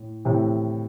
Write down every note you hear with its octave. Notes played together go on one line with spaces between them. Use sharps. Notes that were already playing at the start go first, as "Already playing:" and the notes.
Already playing: A2
A2 C3